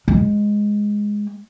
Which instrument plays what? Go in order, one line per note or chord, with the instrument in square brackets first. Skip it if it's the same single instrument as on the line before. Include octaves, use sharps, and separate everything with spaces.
[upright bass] G#3